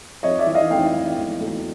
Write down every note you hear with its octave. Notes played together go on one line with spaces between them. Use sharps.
F2 C#5 D#5
D5 E5
E3
D#5 F5
F1 F5 G5
E3
E1
D2